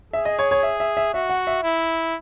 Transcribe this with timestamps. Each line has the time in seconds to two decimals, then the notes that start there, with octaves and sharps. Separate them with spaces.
0.13 G#4 E5
0.25 D#5
0.39 C#5
0.51 C#5
0.63 E5
0.80 E5
0.97 E5
1.14 F#4 E5
1.30 F#5
1.47 E5
1.63 E4